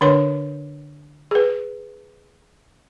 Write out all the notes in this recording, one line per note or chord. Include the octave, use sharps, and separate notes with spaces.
D3 D4 B4 C#5 C6
G#4 B4